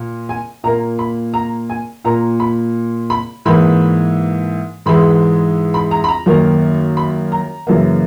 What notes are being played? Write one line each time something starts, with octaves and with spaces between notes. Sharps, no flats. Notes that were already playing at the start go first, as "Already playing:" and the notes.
Already playing: A#2 A#3
G#5
A#2 A#3 A#5
B5
A#5
G#5
A#2 A#3 A#5
B5
B5
G#2 E3 A#3 B5
G#2 E3 G#3 B5
B5
A#5
B5
A#5
F#2 D#3 A#3
B5
A#5
F#2 C#3 E3 A#3